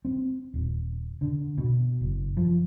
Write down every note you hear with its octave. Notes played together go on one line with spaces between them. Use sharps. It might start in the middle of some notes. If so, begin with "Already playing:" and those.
C4
D#1
D3
B2
F#1
F3